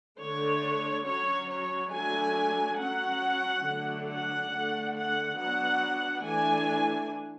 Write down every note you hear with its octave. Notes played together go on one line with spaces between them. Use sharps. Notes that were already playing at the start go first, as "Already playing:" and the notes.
D3 A3 D4 C#5
F#3 C#4 C#5
C#5
F#3 A3 D4 G#5
F#3 C#4 F#5
D3 F#3 A3 D4
F#5
D3 A3 D4
F#5
F#3 B3 D4 F#5
E3 A3 D4 G#5